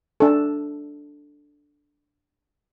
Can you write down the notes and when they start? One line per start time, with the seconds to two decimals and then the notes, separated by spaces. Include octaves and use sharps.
0.20 D4 A4